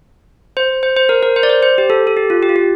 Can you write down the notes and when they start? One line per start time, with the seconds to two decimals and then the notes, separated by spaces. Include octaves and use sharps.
0.57 C5
0.83 C5
0.97 C5
1.09 A#4
1.23 A#4
1.36 C5
1.43 D5
1.49 C5
1.63 C5
1.78 G4
1.90 A4
2.07 A4
2.17 G4
2.30 F4
2.43 G4
2.49 F4
2.56 G4